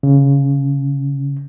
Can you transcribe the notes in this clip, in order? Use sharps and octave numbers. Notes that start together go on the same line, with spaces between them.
C#3